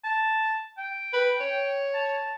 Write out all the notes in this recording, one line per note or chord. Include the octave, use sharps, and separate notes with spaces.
A5
G5
B4
C#5
A5